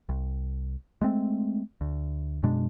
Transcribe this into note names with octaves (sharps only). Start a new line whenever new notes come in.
C2
G#3 A3 C4
D2
F#2 B2 G#3 D4